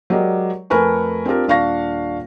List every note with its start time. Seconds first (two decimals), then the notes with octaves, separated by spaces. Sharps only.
0.10 F#3 G#3 G4 A#4 D5 D#5
0.70 F2 A3 A#4 B4 G#5 C#6
1.26 C4 D4 F4 G4 A#4
1.48 D#1 D4 F5 C#6 A#6